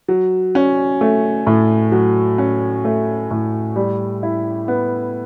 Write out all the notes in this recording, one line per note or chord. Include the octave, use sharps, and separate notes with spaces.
F#3
C#4
A3
A2
F#3
C#4
A3
A2
G3
E4
B3